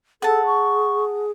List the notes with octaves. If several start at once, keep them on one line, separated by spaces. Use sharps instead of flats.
G#4 A4 F#5 A5
C#6